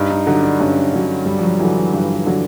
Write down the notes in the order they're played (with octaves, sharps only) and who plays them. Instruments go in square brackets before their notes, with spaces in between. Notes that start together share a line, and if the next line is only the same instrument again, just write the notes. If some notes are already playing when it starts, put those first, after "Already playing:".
Already playing: [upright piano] G2 [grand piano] D#4
[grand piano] D#4
[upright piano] D3 F#3 [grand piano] D#4
[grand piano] D4
[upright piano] G2 [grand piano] C#4
[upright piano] D3 F#3
[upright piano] G2 [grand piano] G3
[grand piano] F3
F#3
[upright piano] D3 F#3 [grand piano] E3
[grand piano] E3
[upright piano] G2 [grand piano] F3
[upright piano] D3 F#3